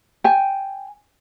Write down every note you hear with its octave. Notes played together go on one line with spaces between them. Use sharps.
G5 G#5